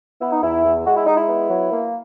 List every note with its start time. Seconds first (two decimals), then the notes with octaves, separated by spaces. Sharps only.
0.21 B3 E4
0.32 D#4
0.43 E2 E4
0.65 E2
0.86 G#3 F#4
0.96 E4
1.07 G#3 D#4
1.17 E4
1.28 B3
1.50 F#3
1.71 A#3